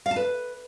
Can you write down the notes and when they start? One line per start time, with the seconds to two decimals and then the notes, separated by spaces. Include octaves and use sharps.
0.06 F5
0.11 A5
0.16 B4